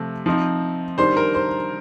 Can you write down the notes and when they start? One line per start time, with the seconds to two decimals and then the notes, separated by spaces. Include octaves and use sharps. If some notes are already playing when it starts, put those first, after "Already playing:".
Already playing: C3 F3 A3
0.26 F3 C4 D#4
0.98 D#3 G3 D4 C5 C6
1.17 A#4 A#5
1.34 C5 C6